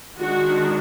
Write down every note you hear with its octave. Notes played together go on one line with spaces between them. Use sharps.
D#3 G#3 D4 F#4